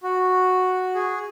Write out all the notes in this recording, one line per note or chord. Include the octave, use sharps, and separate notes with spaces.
F#4
G#4